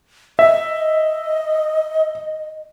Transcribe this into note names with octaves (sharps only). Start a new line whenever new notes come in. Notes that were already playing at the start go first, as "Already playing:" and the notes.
D#5 E5